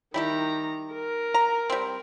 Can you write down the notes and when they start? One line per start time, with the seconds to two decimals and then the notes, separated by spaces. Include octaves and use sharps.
0.14 D#3 G3 E4 G4 A#5
0.94 A#4
1.34 A#5
1.70 G3 C4